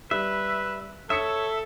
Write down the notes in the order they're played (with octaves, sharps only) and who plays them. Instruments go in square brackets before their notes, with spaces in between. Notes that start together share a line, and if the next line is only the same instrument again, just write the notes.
[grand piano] G3 [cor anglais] B4 [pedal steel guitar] E5
[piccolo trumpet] A4 [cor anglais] C#5 [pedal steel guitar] E5 [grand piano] D#6 B6 C#7